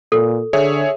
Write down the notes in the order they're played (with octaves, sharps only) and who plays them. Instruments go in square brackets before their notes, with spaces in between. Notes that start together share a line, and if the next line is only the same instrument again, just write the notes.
[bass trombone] A#2 [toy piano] A4
[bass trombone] D3 [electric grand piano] G#4 C#5 E5